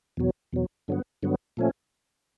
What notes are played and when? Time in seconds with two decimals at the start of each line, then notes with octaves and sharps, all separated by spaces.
0.17 E2 B2 F#3
0.53 E2 B2 F#3
0.88 G2 D3 F#3 B3
1.23 G2 D3 F#3 B3
1.57 A#2 F3 A3 C#4